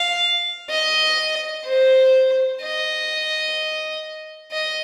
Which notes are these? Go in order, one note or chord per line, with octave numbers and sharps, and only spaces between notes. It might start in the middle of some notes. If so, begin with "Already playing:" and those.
Already playing: F5
D#5
C5
D#5
D#5